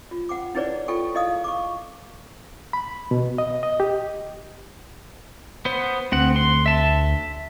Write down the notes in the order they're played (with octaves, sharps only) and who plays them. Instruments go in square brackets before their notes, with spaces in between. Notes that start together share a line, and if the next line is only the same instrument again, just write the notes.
[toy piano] F4
F#5 G5 D6
D#4 E4 G#4 B4 C#5 D5
F4 A4 G5 C#6
E4 G#4 D#5 F5 D#6
C#6 D6
[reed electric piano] B5
B2
D#5
D#5
G4
[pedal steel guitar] B3 C5
[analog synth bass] D2 [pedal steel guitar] C4 F#5
[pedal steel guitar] C6
E5 A5